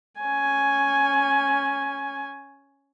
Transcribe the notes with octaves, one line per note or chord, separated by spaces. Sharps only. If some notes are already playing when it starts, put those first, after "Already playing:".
C#4 G#5